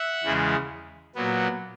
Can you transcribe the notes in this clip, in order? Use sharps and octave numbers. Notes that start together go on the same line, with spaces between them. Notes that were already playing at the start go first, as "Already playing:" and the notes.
Already playing: E5 F#5
E2 C#3 E3 G#3
A#2 F#3 B3